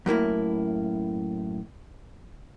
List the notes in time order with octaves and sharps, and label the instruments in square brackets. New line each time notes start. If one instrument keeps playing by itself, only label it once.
[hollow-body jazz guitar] F#2 A2 A#3 E4